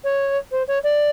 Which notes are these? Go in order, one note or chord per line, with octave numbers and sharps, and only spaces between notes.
C#5
C5
C#5
D5